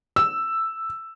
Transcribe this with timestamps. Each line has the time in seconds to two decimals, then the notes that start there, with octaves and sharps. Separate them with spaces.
0.16 E6